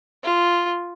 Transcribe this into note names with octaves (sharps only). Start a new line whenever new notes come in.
F4